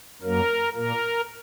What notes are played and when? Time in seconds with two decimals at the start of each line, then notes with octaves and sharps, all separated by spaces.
0.22 F#2 F#3 A#3 A#4
0.74 A#2 A#3 A#4